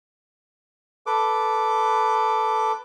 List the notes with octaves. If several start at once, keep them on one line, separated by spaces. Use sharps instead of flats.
A4 B4 D6